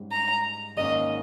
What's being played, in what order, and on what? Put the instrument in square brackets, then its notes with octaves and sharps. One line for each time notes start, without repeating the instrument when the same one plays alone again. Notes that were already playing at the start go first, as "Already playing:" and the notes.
Already playing: [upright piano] G#2 G3 C#4 G4
[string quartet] A#5
[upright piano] G#1 G#2 D#3 A#3 C#4 [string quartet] D#5